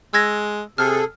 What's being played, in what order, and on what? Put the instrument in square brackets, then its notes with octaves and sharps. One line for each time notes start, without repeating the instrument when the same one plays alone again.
[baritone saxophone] G#3 [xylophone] E6 G#6 A#6
[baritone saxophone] C3 [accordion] G#4 A4 [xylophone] F6